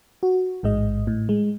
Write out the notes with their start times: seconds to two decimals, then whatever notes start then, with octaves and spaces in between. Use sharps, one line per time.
0.23 F#4
0.63 A1 G#2 G#3 D#5
1.07 A2
1.29 G#3